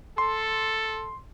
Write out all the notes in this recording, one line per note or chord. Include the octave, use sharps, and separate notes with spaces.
A4 C6